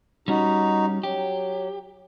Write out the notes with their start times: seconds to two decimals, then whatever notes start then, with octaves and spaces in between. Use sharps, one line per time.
0.28 G3 C#4 D#4 F#4
1.03 F#3 G4